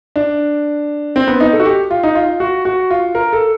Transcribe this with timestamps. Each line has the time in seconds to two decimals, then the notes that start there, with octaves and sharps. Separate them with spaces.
0.16 D4
1.16 C4
1.28 B3
1.40 D#4
1.53 A4
1.60 F#4
1.65 G4
1.91 F4
2.03 D#4
2.15 F4
2.40 F#4
2.65 F#4
2.91 F4
3.15 A#4
3.33 A4